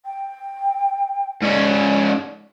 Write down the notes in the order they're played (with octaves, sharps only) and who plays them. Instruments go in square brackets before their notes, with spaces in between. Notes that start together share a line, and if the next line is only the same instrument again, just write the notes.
[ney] G5
[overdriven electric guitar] G#2 C#4 [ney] D5